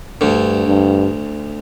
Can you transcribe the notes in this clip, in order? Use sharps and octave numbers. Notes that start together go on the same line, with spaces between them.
D2 G2 D3
G2